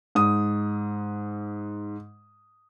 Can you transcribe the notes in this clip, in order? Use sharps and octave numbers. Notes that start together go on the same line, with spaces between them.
G#2 D#6